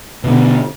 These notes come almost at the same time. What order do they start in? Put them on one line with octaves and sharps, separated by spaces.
B2 D3 B3